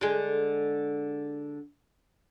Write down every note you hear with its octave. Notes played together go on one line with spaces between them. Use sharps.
D3 G#3